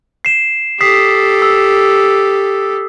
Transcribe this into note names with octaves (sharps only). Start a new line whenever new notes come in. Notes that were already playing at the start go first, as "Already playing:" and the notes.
C7 E7
G4 A4 D#6 B6 C7
E6